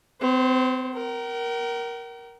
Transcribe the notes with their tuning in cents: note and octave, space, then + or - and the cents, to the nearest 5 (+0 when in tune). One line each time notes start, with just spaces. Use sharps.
C4 -35 C5 +25
A#4 +10 G5 -45